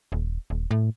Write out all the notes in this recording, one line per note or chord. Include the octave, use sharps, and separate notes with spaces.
D#1
D#1
A2